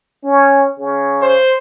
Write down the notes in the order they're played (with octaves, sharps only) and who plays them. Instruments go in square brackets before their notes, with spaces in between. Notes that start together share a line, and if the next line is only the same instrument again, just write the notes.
[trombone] C#4
C#3
[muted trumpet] C5